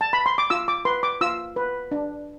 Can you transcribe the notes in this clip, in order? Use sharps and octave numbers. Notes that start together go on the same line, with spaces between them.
A5
B5
C6
D6
F4 E6
D6
B4 C6
D6
F4 E6
B4
D4